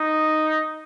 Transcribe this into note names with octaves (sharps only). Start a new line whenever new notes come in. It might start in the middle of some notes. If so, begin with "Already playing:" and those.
Already playing: D#4